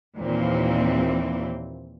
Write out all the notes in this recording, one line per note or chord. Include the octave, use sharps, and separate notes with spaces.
D#2 A#2 E3 A#3 C4